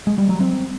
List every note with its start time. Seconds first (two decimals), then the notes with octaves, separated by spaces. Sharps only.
0.07 G#3
0.18 G3
0.29 F#3
0.40 C4